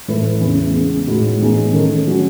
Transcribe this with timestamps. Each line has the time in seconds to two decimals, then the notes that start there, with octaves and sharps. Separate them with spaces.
0.08 A2 E3 A3 E4 B4
0.41 E2 C#3 E3
0.74 C#3 G#3 B3
1.07 A2 G#3 D#4 F#4
1.39 A2 E3 B3 D#4 G#4
1.73 D#3 A3 C#4
2.07 F#3 C#4